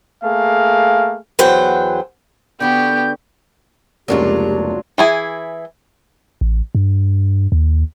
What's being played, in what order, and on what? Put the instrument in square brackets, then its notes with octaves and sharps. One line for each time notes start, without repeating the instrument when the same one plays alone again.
[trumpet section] A3 A#3 G#4 F5
[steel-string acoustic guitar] E2 E3 F#3 C5 F#5 G5
[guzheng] D3 F#4 B4 [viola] B3 [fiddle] G4 [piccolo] G6
[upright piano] F1 C#2 A#3 [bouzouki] F#3 D4 F4 [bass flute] G4
[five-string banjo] E3 E4 G#4
[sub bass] A1
G2
D#2